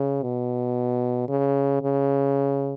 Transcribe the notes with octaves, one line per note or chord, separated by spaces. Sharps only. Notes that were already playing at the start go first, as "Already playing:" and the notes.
Already playing: C#3
B2
C#3
C#3